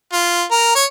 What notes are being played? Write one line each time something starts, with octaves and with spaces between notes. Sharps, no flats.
F4
A#4
C#5